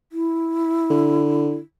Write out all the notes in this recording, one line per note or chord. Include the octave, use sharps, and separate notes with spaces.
E4
D3